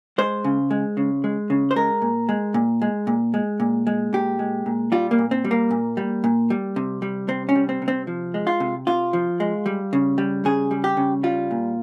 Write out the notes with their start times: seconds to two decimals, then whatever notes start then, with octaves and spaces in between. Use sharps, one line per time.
0.18 G#3 C5
0.44 C#3
0.71 G#3
0.97 C#3
1.24 G#3
1.50 C#3
1.71 C5
1.76 G#3 A#4
2.02 A#2
2.29 G#3
2.54 A#2
2.82 G#3
3.07 A#2
3.34 G#3
3.60 A#2
3.87 G#3
4.13 A#2 G4
4.39 G#3
4.66 A#2
4.92 G3 F4
5.11 A#3
5.19 A#2
5.31 C4
5.45 G3
5.51 A#3
5.71 A#2
5.97 G3
6.24 A#2
6.50 G3
6.76 C3
7.02 G3
7.28 C3 C4
7.49 C#4
7.55 G3
7.69 C4
7.82 C3
7.88 C4
8.07 F3
8.34 G#3
8.47 F4
8.60 C3
8.87 C3 F4
9.13 F3
9.40 G#3
9.66 G3
9.93 C#3
10.18 G3
10.45 C#3 G#4
10.71 G3
10.84 G4
10.97 C#3
11.23 G3 F4
11.51 A#2